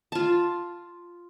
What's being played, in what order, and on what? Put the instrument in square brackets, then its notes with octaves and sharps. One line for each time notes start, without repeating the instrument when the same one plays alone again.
[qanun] F4 A5